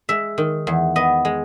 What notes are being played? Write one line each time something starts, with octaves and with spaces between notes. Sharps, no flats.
G#3 E5
D#3
E2
B3 D#5
G#3